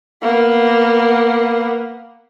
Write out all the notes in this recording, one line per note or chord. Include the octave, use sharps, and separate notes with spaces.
A#3 B3